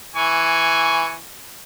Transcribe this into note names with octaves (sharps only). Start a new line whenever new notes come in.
E3 G#5 C#6